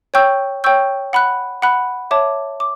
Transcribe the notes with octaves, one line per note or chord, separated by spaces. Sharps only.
C#5 G5 C#6 E6 G6
C#5 G5 C#6 E6 G6
F#5 B5 F#6
F#5 B5 F#6
C#5 E5 A5 D6
D6